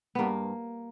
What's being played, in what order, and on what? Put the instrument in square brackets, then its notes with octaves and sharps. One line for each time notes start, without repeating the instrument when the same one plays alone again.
[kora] G2 A#3 B3